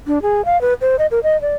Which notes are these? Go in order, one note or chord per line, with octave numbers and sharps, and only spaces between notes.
D4
G#4
F5
B4
C5
D#5
A#4
D#5
D5